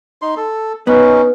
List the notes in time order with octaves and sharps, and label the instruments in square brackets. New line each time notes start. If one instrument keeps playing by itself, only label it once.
[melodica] D#4 C6
A4
[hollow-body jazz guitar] B3 [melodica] C#4 D#4